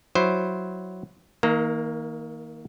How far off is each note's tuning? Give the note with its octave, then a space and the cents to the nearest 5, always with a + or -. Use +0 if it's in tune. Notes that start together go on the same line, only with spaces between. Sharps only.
F#3 +0 E4 +0 C5 +0
D#3 +40 A#3 +0 A#5 -25